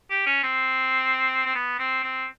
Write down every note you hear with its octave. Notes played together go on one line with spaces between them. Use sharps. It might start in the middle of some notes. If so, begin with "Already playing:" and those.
G4
C#4
C4
C4
B3
C4
C4